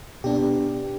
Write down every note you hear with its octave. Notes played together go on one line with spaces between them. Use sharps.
B2 B3 D4 G4